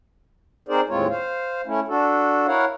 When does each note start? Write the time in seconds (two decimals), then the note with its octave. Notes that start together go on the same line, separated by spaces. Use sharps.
0.69 C4 D#4 G#4 A#4 C5 D5
0.89 D#2 A2 G#3 C4 F4 C#5
1.10 C5 F5
1.66 A3 C#4 E4
1.88 D4 F#4 A4
2.47 E4 A#4 C#5 F5 F#5